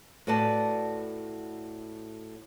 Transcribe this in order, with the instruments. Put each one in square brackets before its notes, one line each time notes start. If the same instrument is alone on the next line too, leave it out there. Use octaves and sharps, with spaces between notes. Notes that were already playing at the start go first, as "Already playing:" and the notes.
[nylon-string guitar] A2 F#4 B4 D5 A5